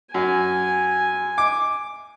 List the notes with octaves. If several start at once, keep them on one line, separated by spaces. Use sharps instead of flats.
F#2 G#5
D6